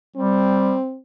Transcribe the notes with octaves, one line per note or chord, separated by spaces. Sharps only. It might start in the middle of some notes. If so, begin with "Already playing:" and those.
G3 C4